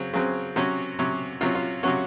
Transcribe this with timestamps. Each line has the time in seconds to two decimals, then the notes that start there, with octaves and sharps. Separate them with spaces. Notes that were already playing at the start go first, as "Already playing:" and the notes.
Already playing: C#3 F#3 C4
0.13 C#3 F#3 C4
0.56 C3 F#3 C#4 F#4
0.99 C3 F#3 C#4
1.41 C3 F#3 C#4 F4
1.55 F4
1.83 C3 F#3 C#4 F#4